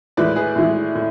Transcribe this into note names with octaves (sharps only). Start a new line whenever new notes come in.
A2 E3 G#3 B4 D5
G#4 B4
A2 E3 G#3
A2